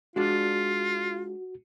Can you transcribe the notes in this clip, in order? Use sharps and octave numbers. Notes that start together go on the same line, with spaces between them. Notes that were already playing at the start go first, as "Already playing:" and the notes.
G#3 D4 F4 F#4 D5